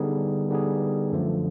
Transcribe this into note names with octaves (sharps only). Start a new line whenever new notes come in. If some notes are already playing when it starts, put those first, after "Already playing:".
Already playing: D3 G3 B3 D#4 G#4
D3 G3 B3 D#4 G#4
F#2 D3 F3 A3